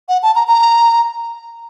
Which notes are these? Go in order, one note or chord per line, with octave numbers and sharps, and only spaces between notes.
F#5
A5
A#5
A#5